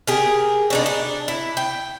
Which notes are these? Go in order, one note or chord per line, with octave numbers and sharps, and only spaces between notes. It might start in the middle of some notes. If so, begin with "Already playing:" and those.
G4 G#4 A#4
B2 D4 D#4
D4
E4
G5